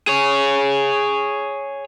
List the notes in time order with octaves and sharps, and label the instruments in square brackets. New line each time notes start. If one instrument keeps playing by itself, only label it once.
[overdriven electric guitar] G#4 C#5